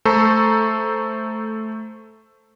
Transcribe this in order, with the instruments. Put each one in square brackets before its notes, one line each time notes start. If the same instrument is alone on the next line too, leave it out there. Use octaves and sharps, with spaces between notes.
[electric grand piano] A3 A4 C5 A#5 C#6